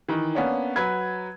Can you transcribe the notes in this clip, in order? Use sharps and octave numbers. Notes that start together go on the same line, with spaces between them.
D#3 E3
A#3 B3 C#4 D4
F#3 B4 G#6